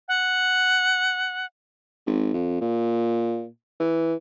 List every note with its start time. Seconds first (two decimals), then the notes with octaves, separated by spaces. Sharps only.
0.08 F#5
2.06 G#1
2.34 F2
2.61 A#2
3.80 E3